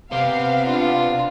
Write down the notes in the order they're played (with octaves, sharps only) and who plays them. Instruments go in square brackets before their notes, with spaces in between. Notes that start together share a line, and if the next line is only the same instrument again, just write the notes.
[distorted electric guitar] C3 C5 [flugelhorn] B3 [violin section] F5
[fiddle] D4 F4